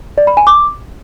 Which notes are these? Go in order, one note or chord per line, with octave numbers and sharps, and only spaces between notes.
D5
B5
G#5
D6